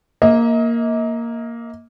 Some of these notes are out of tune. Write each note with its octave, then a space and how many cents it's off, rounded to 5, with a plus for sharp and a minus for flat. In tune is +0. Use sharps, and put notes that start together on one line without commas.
A#3 +0 D#5 +40